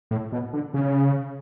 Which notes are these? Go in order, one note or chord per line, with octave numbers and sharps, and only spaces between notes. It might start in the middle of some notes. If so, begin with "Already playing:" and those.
A2
B2
D3
C#3